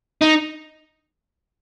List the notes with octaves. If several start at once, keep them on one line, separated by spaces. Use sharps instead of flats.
D#4